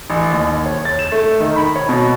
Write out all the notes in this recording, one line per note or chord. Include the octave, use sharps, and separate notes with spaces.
A1
D#2
C#5
A6
E7
A3
D#3
B5
C#5
B2